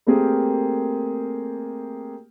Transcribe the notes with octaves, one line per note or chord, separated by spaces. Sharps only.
A3 A#3 C4 G4 G#4 A#4